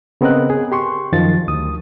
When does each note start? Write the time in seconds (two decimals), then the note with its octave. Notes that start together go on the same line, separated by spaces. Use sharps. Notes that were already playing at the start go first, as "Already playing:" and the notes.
0.21 C#3 B3 C4 A#4 D#5 F#6
0.50 G#4
0.72 G4 C6 C#6
1.12 F#2 D#3 F3 A6
1.48 D2 D#6